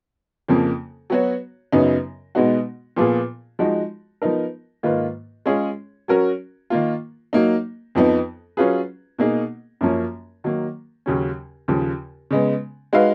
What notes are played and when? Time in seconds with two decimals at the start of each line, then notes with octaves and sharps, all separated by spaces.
0.48 F2 C#3 F3 A#3
1.10 F#3 B3 F#4 C#5
1.72 F#2 C#3 F#3 B3 D#4
2.35 B2 G#3 B3 D#4 F#4
2.97 A#2 F3 B3 F4 G#4
3.59 F3 G#3 D#4 F#4
4.22 F3 B3 D#4 A#4
4.83 G#2 D#3 A#3 F4 B4
5.46 G#3 C#4 F4 G#4 C#5
6.08 F#3 C#4 F#4 A#4
6.70 D#3 A#3 F4
7.33 F#3 A#3 D#4
7.95 F2 F3 B3 D#4
8.57 F#3 C#4 F4 G#4 B4
9.19 B2 A#3 D#4 G#4
9.81 F#2 F3 A#3 C#4
10.44 D#3 F#3 A#3
11.06 D#2 C#3 F#3 C#4
11.68 D#2 C#3 F3
12.31 C#3 G#3 B3
12.93 G#3 D#4 F#4 B4 F5